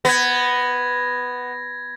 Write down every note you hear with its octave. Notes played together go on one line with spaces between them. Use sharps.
B3 G#6 A#6